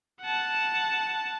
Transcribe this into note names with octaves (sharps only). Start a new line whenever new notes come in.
F#5 A5